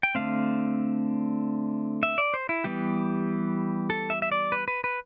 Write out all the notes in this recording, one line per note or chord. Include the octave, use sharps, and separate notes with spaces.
G5
D3 A3 C4 F5
E5
D5
C5
E4
E3 G3 B3 G4
A4
E5
E5
D5
B4
B4
B4